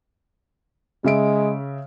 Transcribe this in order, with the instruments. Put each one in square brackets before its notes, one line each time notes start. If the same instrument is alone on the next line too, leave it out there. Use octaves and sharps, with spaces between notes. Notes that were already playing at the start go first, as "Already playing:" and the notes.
[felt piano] C#3 E5 D7 [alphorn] G#3